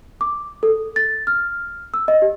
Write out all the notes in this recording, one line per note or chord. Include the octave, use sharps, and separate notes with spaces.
D6
A4
A6
F6
E6
D#5
G4